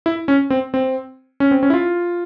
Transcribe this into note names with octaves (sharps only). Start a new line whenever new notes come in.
E4
C#4
C4
C4
C#4
C4
C#4
E4
F4